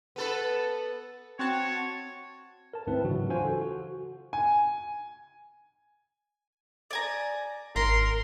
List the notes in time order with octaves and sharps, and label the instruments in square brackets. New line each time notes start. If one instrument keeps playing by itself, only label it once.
[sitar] B3 A4 B4
[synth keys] C4 F#4 A5 [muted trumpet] C#5
[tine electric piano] A#4 A5
D2 G#2 C4 E4 B4
C#3 E3 F#3 D4 F#4
F4 F#4 C5 G#5
A4
F#4
[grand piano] G#5
[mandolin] D5 G#5 A#5
[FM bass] G#1 [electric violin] A#4 [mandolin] A#5 [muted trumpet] C6